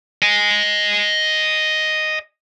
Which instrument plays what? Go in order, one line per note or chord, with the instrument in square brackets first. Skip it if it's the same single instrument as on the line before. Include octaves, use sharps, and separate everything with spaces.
[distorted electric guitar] D#5 G#5